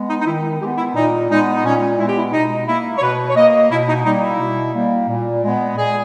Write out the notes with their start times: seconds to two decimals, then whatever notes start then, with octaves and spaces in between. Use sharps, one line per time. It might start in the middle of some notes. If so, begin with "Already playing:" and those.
Already playing: G#3 B3
0.09 D#4
0.21 D#4
0.26 D#3 E4
0.61 G#3 B3 G4
0.78 E4
0.95 A#2 D#4
1.30 G#3 B3 D#4
1.57 D#4
1.65 A#2 C#4
1.99 G#3 B3 E4
2.08 G4
2.18 E4
2.33 B2 D#4
2.68 A#3 E4
2.98 C#5
3.02 B2 B4
3.30 C#5
3.36 A#3 D#5
3.71 B2 E4
3.88 D#4
4.05 G3 A#3 D#4
4.23 E4
4.40 B2
4.74 G3 A#3
5.09 A#2
5.43 G#3 B3
5.77 A#2 G#4